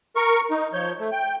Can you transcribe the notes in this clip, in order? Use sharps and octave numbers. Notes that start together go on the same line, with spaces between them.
A#4 C#6
D#4
F3 C#5 G6
A3
G5